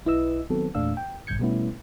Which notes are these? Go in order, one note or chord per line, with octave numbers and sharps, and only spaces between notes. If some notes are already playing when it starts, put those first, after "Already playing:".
B1 E4 B4 D#5 E6
D#3 F#3 B3 C4 A4
E2 A#2 A3 D4 F5 E6
G5
A1 G2 D3 G6 G#6 C#7
B2 G3 A3 B3 C#4 E4